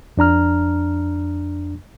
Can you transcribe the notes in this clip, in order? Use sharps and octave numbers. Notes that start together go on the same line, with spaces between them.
F2 D4 A#5 F6